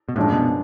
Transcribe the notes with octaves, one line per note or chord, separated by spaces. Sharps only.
B2
F#2 A2 F3 G#3 D4
B2